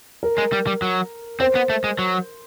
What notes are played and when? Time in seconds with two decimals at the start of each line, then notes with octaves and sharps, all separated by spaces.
0.23 A#4
0.38 G#3
0.53 G3
0.67 G3
0.82 F#3
1.40 C4 C5
1.55 B3
1.70 A3
1.84 G#3
1.99 F#3